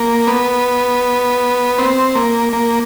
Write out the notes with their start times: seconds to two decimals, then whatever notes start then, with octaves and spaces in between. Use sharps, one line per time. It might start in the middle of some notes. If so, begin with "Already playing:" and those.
Already playing: A#3
0.27 B3
1.78 C4
2.15 A#3
2.53 A#3